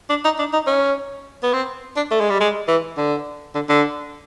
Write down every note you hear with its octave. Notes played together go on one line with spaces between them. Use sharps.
D4
D#4
D4
D#4
C#4
B3
C4
D4
A3
G#3
G3
G#3
E3
D3
D3
D3